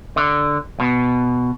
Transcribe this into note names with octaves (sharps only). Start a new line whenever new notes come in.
D3
B2